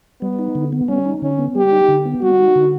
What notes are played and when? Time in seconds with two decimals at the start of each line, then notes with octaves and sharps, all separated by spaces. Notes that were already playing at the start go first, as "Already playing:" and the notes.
0.22 G3 B3
0.39 D#4
0.55 D3
0.72 B3
0.88 G3 C#4
1.05 D#4
1.22 D3 C#4
1.39 B3
1.55 G3 G4
1.72 D#4
1.89 D3
2.05 B3
2.22 G3 F#4
2.39 D#4
2.56 D3